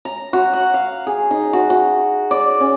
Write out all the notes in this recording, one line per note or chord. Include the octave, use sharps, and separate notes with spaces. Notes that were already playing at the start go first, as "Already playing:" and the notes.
A#5
F#4
F#5
F5
G#4
D#4
F#4
F#4
D5
C#4